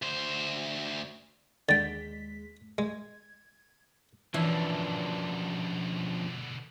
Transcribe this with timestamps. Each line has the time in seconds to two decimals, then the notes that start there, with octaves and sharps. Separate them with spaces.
0.02 D2 C5
1.69 D#2 D3 G#3 G5 A6 B6
2.78 G#3 G#6
4.34 B2 D3 E3 F3 C#4 D4 E4